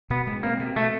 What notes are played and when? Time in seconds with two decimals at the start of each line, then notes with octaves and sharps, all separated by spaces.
0.10 B2 B3
0.27 G#3
0.43 A#3 C4
0.60 B2
0.76 B2 A3